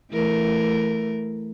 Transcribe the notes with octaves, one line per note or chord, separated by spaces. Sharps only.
E3 A3 A#4